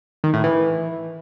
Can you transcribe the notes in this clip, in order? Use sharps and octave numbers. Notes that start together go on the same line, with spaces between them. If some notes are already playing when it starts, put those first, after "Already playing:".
D#3
A2
E3